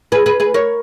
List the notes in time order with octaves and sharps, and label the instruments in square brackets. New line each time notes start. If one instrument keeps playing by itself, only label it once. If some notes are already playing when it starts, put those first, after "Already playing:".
[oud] G#4 B4
G#4 B4
G#4 B4
A#4 C#5